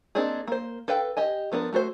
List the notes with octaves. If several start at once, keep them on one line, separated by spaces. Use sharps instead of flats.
A#3 C4 D4 D#4 G#4
A#3 C5
A4 B4 F5 G5
G4 D#5 G#5
F3 B3 D4 A#4
A3 F#4 A4 C5